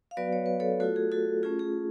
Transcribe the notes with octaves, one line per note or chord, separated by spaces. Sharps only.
F5
F#3 B3 F#4 B4 D5
C#5
B4
A4 C#5
A3 F4 F#4 A4
G#4
F#4 A4
A3 C#4 F4 G#4
G#4